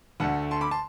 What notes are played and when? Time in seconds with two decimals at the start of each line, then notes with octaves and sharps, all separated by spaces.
0.20 D2 D3 A3 F#5 A5
0.51 A5 C6
0.61 B5 D6
0.71 A5 C6